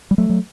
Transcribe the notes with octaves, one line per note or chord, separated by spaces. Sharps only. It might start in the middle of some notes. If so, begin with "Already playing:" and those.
G3
F#3 A3
F#3